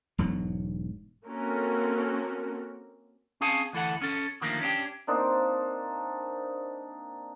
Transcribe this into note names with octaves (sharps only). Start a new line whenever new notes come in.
E1 G#2 B2 F#3
A#3 C4 C#4 F#4 A4 A#4
C4 C#4 G#4 F5 G#5 A5
D2 E3 A4 F#5
C#4 A4
D3 D#3 F3 A3 A#3
C#4 D4 G4
A#3 C4 D4 D#4